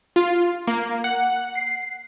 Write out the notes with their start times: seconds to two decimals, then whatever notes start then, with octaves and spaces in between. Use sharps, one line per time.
0.16 F4
0.67 A#3
1.04 F#5
1.55 C7